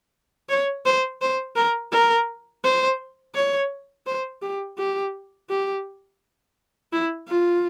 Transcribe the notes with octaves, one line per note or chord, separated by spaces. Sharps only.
C#5
C5
C5
A#4
A#4
C5
C#5
C5
G4
G4
G4
E4
F4